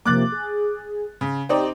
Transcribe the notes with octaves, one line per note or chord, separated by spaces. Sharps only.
C3 F3 A#3 D6 F#6 A6
G#4
C#3
C4 D#4 G4 D5